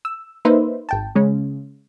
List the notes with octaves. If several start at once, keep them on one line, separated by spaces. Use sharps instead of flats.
E6
A#3 D#4 B4 C5 E5
G#1 G5 A5
C#3 G#3 C#4